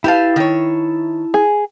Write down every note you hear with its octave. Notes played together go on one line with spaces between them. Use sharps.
E4 G4 B4 F5 A5
D#3 C#5
G#4